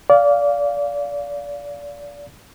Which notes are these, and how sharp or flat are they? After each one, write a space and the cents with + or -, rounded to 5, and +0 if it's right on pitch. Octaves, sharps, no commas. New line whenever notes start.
D5 -25 F5 +0